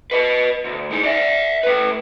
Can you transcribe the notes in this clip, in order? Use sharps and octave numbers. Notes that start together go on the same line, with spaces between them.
B4 D#5
D2
G#3 D#4
D5 E5
A3 B4